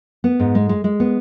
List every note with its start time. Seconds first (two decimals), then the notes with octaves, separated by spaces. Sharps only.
0.24 B3
0.40 G#2
0.55 G#3
0.69 G#3
0.84 G#3
1.00 B3